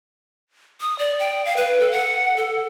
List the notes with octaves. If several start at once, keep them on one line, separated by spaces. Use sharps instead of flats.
D#6
D5
G5
F5
B4
A4
F#5
A4